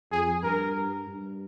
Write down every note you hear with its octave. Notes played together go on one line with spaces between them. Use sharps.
F2 G#4
G2 A#4
G2